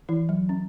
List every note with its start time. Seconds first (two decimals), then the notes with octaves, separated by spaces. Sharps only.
0.09 E3 E4
0.29 F#3
0.49 C#4